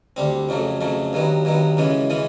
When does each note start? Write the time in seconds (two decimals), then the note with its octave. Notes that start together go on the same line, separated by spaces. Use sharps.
0.16 D2 D3 G3 C4
0.49 F2 C#3 F#3 A3
0.81 F2 C#3 F#3 A3
1.13 G2 D#3 F#3 B3
1.45 G2 D#3 F#3 B3
1.77 F#2 C#3 E3 G#3 C#4
2.10 C#3 E3 G#3 C#4